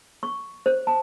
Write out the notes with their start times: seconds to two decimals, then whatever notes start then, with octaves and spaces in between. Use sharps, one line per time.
0.23 C#6
0.66 C5
0.87 A5